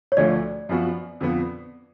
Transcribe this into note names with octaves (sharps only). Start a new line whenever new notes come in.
C#5
D2 D3 F3 A3 D5
F#2 F3 B3 F#4
F2 D3 F3 B3